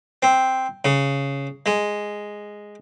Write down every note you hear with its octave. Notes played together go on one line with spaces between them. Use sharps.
C4
C#3
G#3